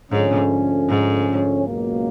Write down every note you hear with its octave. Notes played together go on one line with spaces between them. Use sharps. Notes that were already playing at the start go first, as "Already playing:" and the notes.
G#2 D3 F3 A3 C#4
G#2
C#2 B2 F#3 A#3